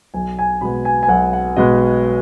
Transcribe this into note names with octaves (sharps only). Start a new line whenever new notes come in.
B1 G#5
G#5
B2 G#3 B3 B5
G#5
G#5
B1 F#5
F#5
B2 G#3 B3 D#5